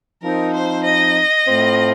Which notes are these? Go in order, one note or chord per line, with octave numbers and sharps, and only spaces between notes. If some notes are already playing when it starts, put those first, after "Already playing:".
F3 C4 D#4 A#4
C5
D#5
A2 A3 C4 F4